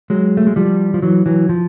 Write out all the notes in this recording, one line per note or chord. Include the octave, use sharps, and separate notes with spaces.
F#3 G#3
A3
G#3
F3 G3
F3
E3 F#3
E3 F#3
F3